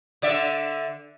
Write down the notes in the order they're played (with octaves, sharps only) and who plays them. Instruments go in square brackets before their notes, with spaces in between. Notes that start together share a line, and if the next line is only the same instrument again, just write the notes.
[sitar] D3 D5 E5